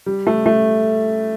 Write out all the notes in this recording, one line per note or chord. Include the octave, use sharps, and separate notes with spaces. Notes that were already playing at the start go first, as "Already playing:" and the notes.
G3
A3
A3